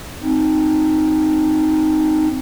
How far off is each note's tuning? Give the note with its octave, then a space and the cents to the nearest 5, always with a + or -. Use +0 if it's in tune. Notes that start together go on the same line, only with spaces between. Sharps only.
C4 +0 D#4 +0